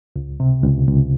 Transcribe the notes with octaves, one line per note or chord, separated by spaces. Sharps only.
C#2
C3
C#2
C#2